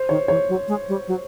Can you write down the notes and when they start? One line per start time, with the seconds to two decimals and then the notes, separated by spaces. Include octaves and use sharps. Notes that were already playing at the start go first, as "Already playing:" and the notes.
Already playing: C5
0.09 D#3 C#5
0.28 E3 C#5
0.49 F#3
0.68 G#3
0.88 G3
1.08 F#3